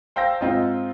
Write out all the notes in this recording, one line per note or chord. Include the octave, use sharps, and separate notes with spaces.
C5 F5 G5 E6 A#6
G#2 C4 D#4 F4